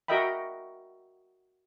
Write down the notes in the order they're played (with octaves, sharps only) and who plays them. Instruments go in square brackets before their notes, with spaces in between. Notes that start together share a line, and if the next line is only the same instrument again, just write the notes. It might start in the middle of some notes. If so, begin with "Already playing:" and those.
[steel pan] F#4 A#4 D#5 E5 G5 B5